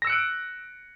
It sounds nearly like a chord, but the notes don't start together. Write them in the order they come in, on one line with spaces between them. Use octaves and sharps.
A#6 E6 C#7 F#6 D7